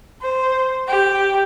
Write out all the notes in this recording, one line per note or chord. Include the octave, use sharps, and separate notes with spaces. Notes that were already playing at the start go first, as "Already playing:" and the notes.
C5
G4